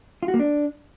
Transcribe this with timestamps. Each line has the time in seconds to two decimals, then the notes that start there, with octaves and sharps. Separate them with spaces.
0.23 F4
0.28 F#4
0.34 A#3
0.39 D4